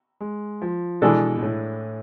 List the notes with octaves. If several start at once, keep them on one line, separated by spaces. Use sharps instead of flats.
G#3
F3
B2 E3 G#3 D4 A4
B2
A2